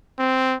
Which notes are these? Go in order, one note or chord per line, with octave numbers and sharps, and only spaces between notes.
C4